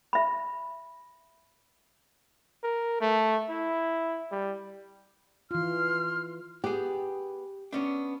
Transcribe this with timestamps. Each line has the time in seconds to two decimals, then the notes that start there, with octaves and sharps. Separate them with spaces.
0.13 E5 B5
2.63 A#4
3.01 A3
3.50 E4
4.32 G3
5.51 E3 F4 C6 F6
6.64 B3 G4 G#4
7.72 B3 C#4 D4